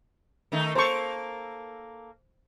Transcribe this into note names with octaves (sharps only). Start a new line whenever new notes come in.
D#3 A3 D#4
A#3 A4 C5 C#6